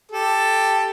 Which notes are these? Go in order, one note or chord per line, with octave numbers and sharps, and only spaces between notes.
G4 A4